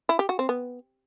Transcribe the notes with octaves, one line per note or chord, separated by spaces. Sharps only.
E4
G4
F#4
C4
B3